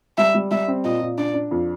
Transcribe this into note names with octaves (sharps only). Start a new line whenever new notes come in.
G3 E5
G3
G3 E5
C4
A#2 D#5
A#2
D4 D5
D4
F2